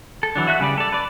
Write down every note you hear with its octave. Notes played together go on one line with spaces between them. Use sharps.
A4
E3 F#3 D4
F#4 E5 F#6
C#3 G3 B4 D5
A4 D5
B4 D5